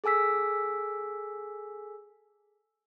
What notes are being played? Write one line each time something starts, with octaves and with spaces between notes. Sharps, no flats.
G#4 A4 G#5 E6 B6